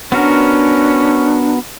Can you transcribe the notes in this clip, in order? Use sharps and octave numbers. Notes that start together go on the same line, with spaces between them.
B3 C#4 D4 F#4 A#4